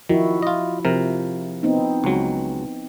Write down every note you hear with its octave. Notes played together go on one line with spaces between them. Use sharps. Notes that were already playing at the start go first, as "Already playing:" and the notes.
D#3 F3 E4 F#4
F4 D#5
C3 F3 A#4
B3 C4 D#4
C#2 F#3